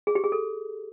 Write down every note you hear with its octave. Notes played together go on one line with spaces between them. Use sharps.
G#4
G4
G#4
A4